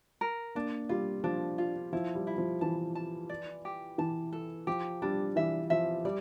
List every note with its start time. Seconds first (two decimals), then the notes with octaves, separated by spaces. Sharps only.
0.21 A#4
0.55 A#3 D4
0.89 G3 F4
1.24 F3 D4
1.58 F4
1.93 F3 E4
2.15 G3
2.27 E4
2.38 F3
2.61 E3 A5
2.95 A5
3.29 D5
3.65 G4
3.98 E3 A5
4.33 A4
4.67 F3 G4
5.02 G3 D4
5.36 E3 E5
5.70 F3 E5
6.05 G3 D5